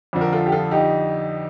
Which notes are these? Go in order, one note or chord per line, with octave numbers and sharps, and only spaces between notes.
F2 D3 F3
A#4
F4 A4
G4
F4 A4
D#4 G4